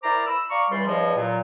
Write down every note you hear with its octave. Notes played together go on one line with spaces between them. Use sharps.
E4 A#4 C5 D5 A#5 D6
B5 E6
D5 F5 A#5 C#6
C#2 E3 G3 C6
E2 G2 F3 C#5 D#5
A#2 F#3